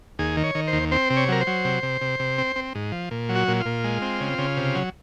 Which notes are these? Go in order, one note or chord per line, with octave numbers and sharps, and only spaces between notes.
D#2 G#4
D#3
C#5
D#3
C5
D#2
C4 C5
C3
C#5
F#3 A#4
C5
F#3
C3
C3
C3
C3
C4
C4
G#2
F3
A#2
F#3
F#4
A#2
F4
A#2
G#3
C4
C#3
C#3
C3
F#3